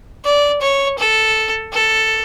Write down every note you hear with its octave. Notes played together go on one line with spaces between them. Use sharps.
D5
C#5
A4
A4